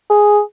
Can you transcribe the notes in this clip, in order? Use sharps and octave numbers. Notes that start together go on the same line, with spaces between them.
G#4